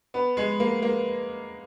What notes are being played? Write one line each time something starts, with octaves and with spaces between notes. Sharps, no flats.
B3
G#3
A#3
A#3